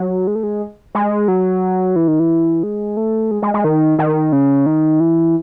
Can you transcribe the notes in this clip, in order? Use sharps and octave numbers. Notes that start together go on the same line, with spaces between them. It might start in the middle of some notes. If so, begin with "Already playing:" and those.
Already playing: F#3
G#3
A3
G#3
G#3
F#3
E3
D#3
E3
G#3
A3
G#3
G#3
G#3
D#3
D#3
C#3
D#3
E3